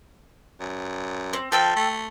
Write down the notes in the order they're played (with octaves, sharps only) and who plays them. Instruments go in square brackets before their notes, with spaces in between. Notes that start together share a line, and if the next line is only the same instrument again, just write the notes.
[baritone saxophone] F#2
[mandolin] C4
[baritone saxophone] F3 [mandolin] A4 G5 E6
[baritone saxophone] A3